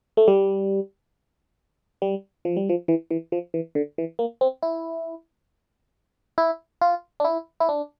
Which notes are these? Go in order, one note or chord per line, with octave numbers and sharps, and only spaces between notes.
A3
G3
G3
F3
G3
F3
E3
E3
F3
E3
D3
E3
A#3
C4
E4
E4
F4
D4
E4
E4
D4